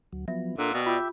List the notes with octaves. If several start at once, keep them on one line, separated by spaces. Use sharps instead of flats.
D2 F#3
F3 F#3 B3 E5
A#2 A#3 D4 A4 F#5 E6
B2 D5 G5
F4 G4 E5